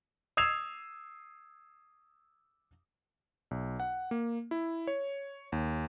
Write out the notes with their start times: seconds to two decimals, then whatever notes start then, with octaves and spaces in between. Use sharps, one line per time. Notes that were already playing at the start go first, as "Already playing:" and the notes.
0.37 D#6 E6 G#6 C7 E7 F7
3.51 B1
3.80 F#5
4.11 A#3
4.51 E4
4.87 C#5
5.52 D#2